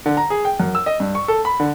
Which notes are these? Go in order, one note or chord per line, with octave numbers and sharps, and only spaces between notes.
D3
A#5
G#4
G5
F#2
E6
D#5
G2
C#6
A4
B5
D3